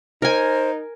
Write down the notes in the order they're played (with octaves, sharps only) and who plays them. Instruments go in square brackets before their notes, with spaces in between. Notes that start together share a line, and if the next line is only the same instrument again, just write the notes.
[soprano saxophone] D#4 [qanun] A#4 G#5 [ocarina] C5